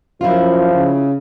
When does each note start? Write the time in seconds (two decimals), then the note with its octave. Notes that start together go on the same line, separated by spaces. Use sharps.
0.21 F#2 F3 E4 F4
0.71 C#3